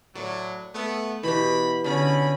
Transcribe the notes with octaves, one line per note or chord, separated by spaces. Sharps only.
A2 F#3 D5
A3 B3
B2 E3 G4 B5
B2 D3 C#4 A4 B5